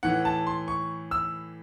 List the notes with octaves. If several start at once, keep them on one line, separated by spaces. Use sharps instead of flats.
A2 E3 F#5
A5
C6
C#6
E6